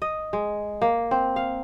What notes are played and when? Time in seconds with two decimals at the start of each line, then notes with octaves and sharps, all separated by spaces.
0.02 D#5
0.33 G#3
0.82 A#3
1.11 C4
1.36 F5